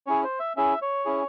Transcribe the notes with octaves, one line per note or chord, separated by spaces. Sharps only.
C#4 E4 G#4 C#5
C5
E5
C#4 E4 G#4 E5
C#5
C#4 E4 G#4